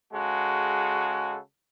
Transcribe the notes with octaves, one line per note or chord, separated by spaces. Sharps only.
C#3 G#3 F#4 A4